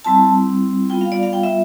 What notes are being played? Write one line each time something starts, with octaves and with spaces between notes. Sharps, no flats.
G3 C4 E4 A5
G3 B3 F4 G5
F5
D5
F5
G5
E5